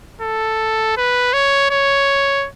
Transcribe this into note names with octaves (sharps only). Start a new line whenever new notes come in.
A4
B4
C#5
C#5